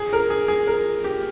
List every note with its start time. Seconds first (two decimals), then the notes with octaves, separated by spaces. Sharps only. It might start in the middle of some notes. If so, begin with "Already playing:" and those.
Already playing: G#4
0.13 A#4
0.30 G#4
0.48 G#4
0.67 A#4
1.04 G4